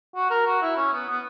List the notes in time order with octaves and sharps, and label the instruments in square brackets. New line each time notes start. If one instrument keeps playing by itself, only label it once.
[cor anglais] F#4
A#4
F#4
E4
C#4
B3
B3